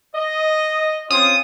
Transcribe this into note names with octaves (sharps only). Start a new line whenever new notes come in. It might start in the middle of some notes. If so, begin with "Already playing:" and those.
D#5
C4 C#4 F4 D#6